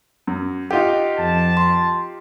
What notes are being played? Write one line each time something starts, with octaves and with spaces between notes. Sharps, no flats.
F#2
D#4 F4 G4 D#5 F#5
F2 A5
C6